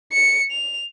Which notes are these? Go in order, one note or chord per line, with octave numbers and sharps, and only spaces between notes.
C#7
F7